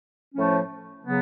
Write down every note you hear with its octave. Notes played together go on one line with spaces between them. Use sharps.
A2 F3 A3 C#4
C#3 F#3 B3